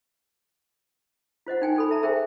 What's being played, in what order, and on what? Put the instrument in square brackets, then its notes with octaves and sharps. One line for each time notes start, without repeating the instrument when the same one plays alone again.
[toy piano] F4 C5 D#5 F#5
D#4 G5 G#5
D#4 A4 B5
E5 A5 A#5
G#4 A#4 C5 E5 G5 G#5